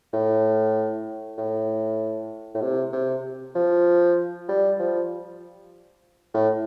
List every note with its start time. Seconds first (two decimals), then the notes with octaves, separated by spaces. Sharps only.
0.13 A2
1.38 A2
2.55 A2
2.62 C3
2.93 C3
3.55 F3
4.48 G3
4.79 F3
6.34 A2